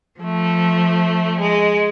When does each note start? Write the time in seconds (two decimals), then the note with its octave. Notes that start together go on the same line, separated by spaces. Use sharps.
0.19 F3 A3
1.38 G#3